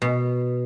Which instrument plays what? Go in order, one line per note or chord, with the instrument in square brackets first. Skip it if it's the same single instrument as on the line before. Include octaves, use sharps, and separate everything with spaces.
[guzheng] B2